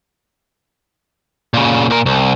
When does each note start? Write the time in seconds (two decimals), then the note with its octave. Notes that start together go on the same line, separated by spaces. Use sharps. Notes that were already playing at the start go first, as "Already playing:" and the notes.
1.54 A#2 C#3
1.90 A#2 A#4
2.06 C2